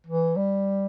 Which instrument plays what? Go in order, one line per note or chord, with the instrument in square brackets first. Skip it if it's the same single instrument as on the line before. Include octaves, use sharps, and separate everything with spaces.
[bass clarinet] E3
G3